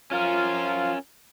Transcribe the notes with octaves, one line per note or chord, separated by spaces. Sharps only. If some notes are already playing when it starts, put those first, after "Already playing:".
F3 C#4 F4 A#4